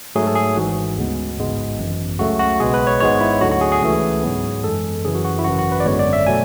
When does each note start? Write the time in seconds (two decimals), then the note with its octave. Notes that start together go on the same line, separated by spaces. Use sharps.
0.15 G#2 F#3 A3 G#4
0.27 A4
0.35 G#4
0.56 G#1 G#2 E3 F#4
0.97 D2 C#3 G#3 B3
1.38 A1 G#2 G#3 B3
1.78 G#1 F#2 E3
2.19 C#2 C#3 F#3 A3 F#4
2.39 F#4
2.60 B1 B2 G#3 B3 G#4
2.74 B4
2.87 C#5
3.00 G#1 G#2 G#3 B3 C#5
3.21 E4
3.41 D2 D3 F#3 F#4
3.51 F#4
3.61 G#4
3.72 G#4
3.82 C#2 C#3 E3 A3
4.23 G#2 F#3 B3
4.64 F#2 E3 G#3 A4
5.04 F#2 C#3 E3 G#4
5.14 F#4
5.25 F#4
5.39 E4
5.44 G#1 F#2 E3 F#4
5.59 F#4
5.72 B4
5.80 D5
5.85 G#1 F#2 D3 G#3 B3 C#5
5.99 D5
6.13 E5
6.27 B2 F#3 A3 G#5